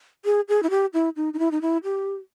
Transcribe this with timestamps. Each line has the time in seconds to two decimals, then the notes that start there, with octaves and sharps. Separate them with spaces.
0.25 G#4
0.48 G#4
0.63 E4
0.70 G4
0.94 E4
1.16 D#4
1.34 D#4
1.39 E4
1.51 D#4
1.62 E4
1.84 G4